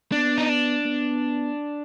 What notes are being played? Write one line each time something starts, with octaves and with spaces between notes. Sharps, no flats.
B3 D4
D#4
D4
B3